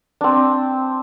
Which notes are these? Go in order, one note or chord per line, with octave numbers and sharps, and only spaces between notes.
C4 D4